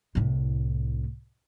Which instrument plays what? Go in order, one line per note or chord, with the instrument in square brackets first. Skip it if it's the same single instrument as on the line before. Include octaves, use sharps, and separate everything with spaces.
[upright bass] C2 A2